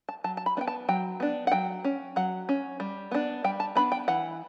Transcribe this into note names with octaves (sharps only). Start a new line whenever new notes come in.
A5
F#3 A5
A5
B5
B3 D4 G5
A5
F#3 G5
B3 D4
F#5
F#3 G5
C#4
F#3 F#5
C#4
G3
B3 D4
G3 G5
A5
B3 D4 B5
G5
E3 F#5